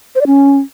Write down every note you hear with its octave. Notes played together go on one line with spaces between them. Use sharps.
C5
D5
C#4